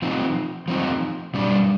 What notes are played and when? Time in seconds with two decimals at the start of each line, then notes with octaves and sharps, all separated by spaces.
0.02 F3 C4 D#4
0.68 F3 C4 D#4
1.34 B2 G3 D4